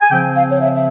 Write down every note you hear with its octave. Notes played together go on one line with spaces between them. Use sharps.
G#5
C#3 F3 C4 G5
F5
C#5
E5
E5